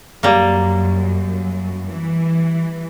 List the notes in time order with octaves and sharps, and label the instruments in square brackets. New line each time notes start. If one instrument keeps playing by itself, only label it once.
[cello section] F#2 [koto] G3 A#3
[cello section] E3